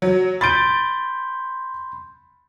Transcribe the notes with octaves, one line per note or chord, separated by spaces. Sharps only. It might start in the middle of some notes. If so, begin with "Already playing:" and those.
F#3
B5 C6 G6 A6 D7